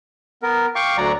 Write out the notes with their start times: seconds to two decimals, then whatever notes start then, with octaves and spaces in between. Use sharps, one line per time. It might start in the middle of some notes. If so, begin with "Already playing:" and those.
0.43 B3 A#4
0.76 F5 G5 C#6 D6
0.98 D2 F#3 D5 A#5